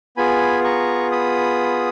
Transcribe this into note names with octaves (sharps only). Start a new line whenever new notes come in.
B3 F4 G#4 G#5 B5
A#5 C#6
B5 D#6